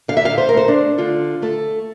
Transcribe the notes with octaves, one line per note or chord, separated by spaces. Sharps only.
D3 F5
E5
F5
C5
A#4
A3 C5
D4
D3 F4
A3 A4